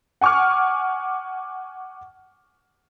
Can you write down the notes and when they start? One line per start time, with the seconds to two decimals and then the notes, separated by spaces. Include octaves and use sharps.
0.21 F#5 G#5 C#6 D6 F6